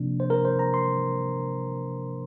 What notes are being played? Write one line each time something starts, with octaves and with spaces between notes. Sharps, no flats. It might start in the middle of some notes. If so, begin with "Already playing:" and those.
Already playing: C3 F3 A#3 D4
C5
A#4
C5
A#5
C6